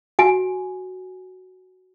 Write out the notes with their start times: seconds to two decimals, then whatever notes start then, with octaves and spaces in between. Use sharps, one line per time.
0.19 F#4 G#5